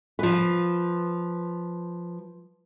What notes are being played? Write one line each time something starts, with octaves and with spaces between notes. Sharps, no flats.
F3 B4